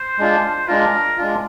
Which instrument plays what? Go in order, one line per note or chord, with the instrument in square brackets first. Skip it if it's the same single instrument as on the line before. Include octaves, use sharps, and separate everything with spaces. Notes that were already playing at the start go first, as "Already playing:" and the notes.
Already playing: [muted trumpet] C5
[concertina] G#3 D4 F4
[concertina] G#3 D4 F4 [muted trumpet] A#4
[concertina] G#3 D4 F4